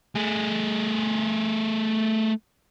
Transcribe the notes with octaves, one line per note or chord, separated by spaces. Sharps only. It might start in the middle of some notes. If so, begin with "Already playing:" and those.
A3 G#4